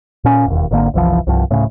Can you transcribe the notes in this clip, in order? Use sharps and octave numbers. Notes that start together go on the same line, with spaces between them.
A#2 C#4
E1 D#2
G#1 D3 A#3
F#1 C2 E3 F3
C2 G2 F3
D1 A2 C#3